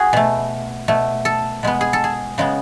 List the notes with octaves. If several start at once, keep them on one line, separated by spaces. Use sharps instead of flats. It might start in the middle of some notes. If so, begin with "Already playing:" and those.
Already playing: F#4 G#4
B2 A3
B2 A3
A4
B2 G#3 B3
G#4
A4
G#4
C#3 G#3 B3